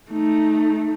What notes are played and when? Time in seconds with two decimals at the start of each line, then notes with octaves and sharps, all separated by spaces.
0.11 A3 D#4